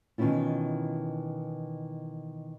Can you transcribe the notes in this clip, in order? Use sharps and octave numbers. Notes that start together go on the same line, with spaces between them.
B2 D#3 E3 C#4 E4 F4